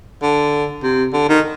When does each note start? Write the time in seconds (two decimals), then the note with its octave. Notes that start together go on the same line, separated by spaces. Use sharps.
0.22 D3
0.83 C3
1.13 D3
1.29 D#3